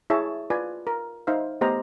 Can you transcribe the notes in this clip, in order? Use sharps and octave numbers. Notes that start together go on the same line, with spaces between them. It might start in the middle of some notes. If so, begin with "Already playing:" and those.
E4 G#4 C#5 E5 A5
F4 B4 D5 G#5
A#4
D#4 C5 E5 F5
A3 B3 G4 C5 D#5 A#5